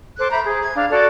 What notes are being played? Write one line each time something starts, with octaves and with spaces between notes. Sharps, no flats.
A4 C5 D6 F#6
E5 A#5 B5 G6
G#4
G#6
D4 F5
F#4 A4 D5